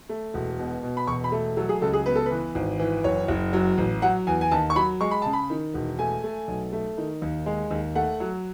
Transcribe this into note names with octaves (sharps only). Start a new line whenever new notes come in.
A3
E1
B2
B2
B5
E1 C#6
B5
A3
F#3 A4
G#4
C#2 A4
G#4
B3 B4
A4
E3 B4
G#1
E3
F#1 C#5
F#1
F#3
A1
F#3 F#5
E2 G#5
G#5
D#2 A5
C#6
F#3 B5
G#3 C#6
B5
C#3 A5
B5
D#3
E1
A3 G#5
A3
B1
A3
D#3
D#2
G#3
D#2
A3 F#5
F#3